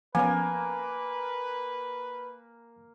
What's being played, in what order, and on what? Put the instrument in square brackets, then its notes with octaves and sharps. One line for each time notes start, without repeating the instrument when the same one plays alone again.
[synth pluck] F3 B3 C#4 [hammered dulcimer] A#3 A#4 [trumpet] B4 [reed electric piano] G#5